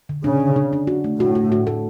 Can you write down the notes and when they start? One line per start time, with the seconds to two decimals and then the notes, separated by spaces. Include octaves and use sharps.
0.09 D3
0.24 C#3 D4
0.40 D3
0.56 D4
0.73 D4
0.87 F#4
1.04 A3
1.19 A2 F#4
1.35 F#4
1.52 F#4
1.67 A4